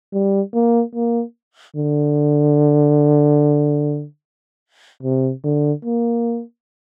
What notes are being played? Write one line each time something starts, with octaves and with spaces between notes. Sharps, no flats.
G3
A#3
A#3
D3
C3
D3
A#3